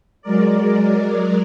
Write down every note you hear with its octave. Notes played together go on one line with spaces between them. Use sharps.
F#3 G#3 A#4 D5